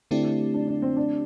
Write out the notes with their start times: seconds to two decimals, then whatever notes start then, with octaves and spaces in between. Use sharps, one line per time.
0.11 D3 A3 C4 D4 E4 G4
0.54 D4
0.68 D4
0.82 C4
0.96 D4